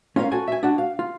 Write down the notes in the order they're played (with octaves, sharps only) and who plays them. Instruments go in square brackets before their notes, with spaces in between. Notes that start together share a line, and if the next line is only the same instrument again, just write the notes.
[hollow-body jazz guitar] C#4 F4 A#4 C#5 F5
F#4 A4 G#5
E5 G#5
D4 F#4
F5
F4